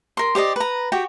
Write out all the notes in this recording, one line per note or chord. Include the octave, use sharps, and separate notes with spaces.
A#4 C6
G4 C5 D5 D#5
B4 A#5
F#4 G4 G5